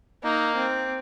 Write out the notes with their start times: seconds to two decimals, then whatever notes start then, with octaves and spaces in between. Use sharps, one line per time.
0.24 A#3 D#4
0.56 C4